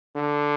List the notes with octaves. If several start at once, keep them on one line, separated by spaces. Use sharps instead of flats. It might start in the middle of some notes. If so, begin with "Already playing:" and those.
D3